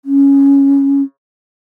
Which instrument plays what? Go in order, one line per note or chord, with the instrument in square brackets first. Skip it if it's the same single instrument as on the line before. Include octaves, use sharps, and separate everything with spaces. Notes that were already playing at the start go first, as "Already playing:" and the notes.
[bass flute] C#4